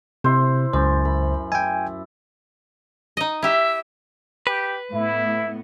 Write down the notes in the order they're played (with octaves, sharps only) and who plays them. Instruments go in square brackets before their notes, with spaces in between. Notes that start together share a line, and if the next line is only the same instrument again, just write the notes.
[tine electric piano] C3 [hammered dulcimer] E4 C5
[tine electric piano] C#2 C5 [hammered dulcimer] F#2
[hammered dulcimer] B5
[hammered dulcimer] E4 [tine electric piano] G5 G#5
[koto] D#4 D#5
[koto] E4 G4 [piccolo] E5
[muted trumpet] G4 [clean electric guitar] B4
[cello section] A2 B3 [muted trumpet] E4